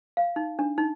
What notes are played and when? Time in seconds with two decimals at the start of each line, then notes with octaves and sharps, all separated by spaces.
0.17 F5
0.36 D#4
0.59 D4
0.78 D#4